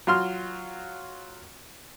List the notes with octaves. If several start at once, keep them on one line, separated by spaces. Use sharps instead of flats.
F#3 F4 C6 F6